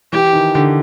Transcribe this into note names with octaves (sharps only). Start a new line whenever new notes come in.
E3 G4
D#3
D3